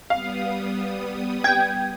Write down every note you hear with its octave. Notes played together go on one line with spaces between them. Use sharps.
G3 B3 F5 D#6
G5 G#6